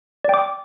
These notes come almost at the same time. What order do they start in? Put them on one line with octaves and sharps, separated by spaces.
D5 G5 D6